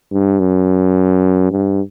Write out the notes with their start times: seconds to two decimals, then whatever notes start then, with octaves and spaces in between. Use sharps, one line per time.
0.12 G2
0.40 F#2
1.51 G2